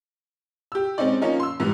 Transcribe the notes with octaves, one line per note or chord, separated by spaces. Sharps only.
G4 E6
G#3 C4 C#4 D#4 D5
F3 A#3 C#4 D#4
C6 E6
G#2 E3 G3 E4